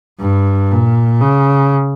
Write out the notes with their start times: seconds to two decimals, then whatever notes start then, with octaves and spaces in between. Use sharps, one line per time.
0.20 G2
0.71 A#2
1.21 C#3